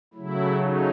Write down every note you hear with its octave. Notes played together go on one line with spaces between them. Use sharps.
C#3 F#3 A3 E4
D#4